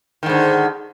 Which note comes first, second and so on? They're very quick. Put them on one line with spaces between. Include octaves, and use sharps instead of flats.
D#3 G#2 D3